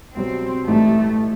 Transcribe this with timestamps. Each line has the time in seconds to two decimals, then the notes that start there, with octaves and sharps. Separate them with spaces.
0.15 C2 B2 F#3 C4
0.68 A1 A2 E3 G3 A3 D#4